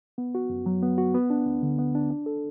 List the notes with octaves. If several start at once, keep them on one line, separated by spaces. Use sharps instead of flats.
B3
F#4
F#2
F#3
B3
F#4
B3
D4
D2
D3
B3
D4
D4
A4